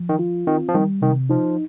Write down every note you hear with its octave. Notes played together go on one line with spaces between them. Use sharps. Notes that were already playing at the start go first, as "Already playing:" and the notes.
Already playing: F3
D#3
F4
D#3 C4
F3
D#3 G3
C3 D#3
F3 D#4